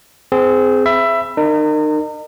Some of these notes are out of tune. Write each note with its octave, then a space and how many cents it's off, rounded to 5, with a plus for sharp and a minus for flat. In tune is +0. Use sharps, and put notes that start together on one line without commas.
C4 -20 G#4 +10
E5 +20 B5 +0
D#4 -35 A#4 -20